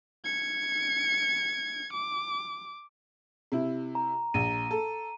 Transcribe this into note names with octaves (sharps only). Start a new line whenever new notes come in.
G#6 C#7
D6
C3 E4
A#5
A#1 D#7
A4